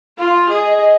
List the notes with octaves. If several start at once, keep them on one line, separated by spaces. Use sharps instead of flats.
F4 F5
G#4 D#5
D#5
D#5